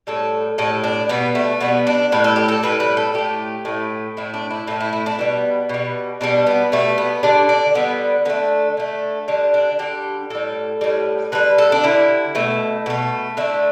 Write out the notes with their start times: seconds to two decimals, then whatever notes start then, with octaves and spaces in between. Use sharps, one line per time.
0.07 A2 G3 A4
0.58 A2 G3 A4
0.84 D4
1.09 B2 G3 B3
1.35 A3
1.61 B2 G3 B3
1.87 D4
2.12 A2 G3 B4
2.24 A4
2.36 G4
2.48 A4
2.63 A2 G3 B4
2.80 B4
2.97 A4
3.14 A2 A3 G4
3.65 A2 A3
4.17 A2 A3 E4
4.34 D4
4.51 E4
4.67 A2 A3 A4
4.81 E4
4.93 E4
5.06 D4
5.19 B2 G3 B3
5.69 B2 G3
6.21 B2 G3 D4
6.47 B3
6.72 B2 G3 A3
6.98 B3
7.23 D3 G3 D4
7.49 D4
7.75 D3 G3 B3
8.25 D3 B3
8.30 A3
8.77 D3 A3
9.28 D3 G3 D4
9.54 D4
9.79 D3 G3 G4
10.30 A2 G3 A4
10.81 A2 G3
11.32 D3 G3 B4
11.58 A4
11.72 D4
11.84 D3 G3 E4
12.35 B2 A3
12.86 B2 A3
13.37 D3 A3 E4